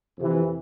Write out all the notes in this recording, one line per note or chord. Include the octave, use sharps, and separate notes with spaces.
F2 C3 E3